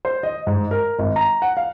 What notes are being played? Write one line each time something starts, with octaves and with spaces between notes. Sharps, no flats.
C5
D#5
G#2
A#4
G#1
A#5
F#5
F5